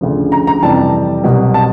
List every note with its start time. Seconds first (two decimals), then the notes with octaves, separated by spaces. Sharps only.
0.01 D2 C#3 F3
0.32 A#5
0.47 A#5
0.62 F2 C3 E3 G3 A5
1.24 C2 B2 F#3
1.54 A5